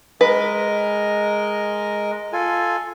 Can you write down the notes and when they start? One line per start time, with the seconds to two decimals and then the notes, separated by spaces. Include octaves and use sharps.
0.21 G#3 A#4 B4 D#5
2.33 F4 A4 G#5